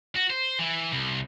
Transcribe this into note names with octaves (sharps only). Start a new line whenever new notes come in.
F#4
C5
E3
C2